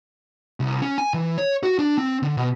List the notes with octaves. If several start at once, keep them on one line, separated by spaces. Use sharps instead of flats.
C2
C#4
G#5
E3
C#5
F#4
D4
C4
D3
B2